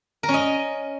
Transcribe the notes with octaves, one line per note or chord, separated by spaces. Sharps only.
A#4
C#4
D#5